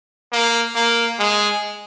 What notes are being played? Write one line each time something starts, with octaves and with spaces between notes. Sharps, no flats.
A#3
A#3
G#3